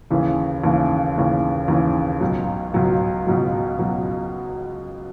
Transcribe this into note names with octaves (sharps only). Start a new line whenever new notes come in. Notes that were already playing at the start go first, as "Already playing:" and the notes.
D#2 C#3 E3
D#2 C#3 E3
D#2 C#3 E3
D#2 C#3 E3
C#2 B2 F#3
C#2 B2 F#3
C#2 B2 F#3
B2 F#3